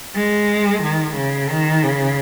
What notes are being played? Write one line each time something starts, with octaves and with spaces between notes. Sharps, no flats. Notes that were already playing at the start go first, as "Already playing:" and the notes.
G#3
D#3
C#3
D#3
C#3